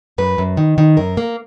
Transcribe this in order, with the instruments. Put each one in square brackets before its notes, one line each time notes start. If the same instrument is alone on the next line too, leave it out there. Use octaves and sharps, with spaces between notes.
[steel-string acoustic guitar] F#2 B4
F#2
D#3
D#3
F#2 A#4
A#3